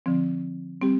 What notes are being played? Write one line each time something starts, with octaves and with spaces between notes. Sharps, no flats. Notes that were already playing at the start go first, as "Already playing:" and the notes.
D3 F3 C4
G3 C4 G4